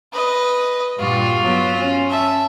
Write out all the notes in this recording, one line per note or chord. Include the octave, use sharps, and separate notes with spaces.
B4 D#5
G2 A#2 G3 F4 F#4
F#3 B3
C#4
E5 A5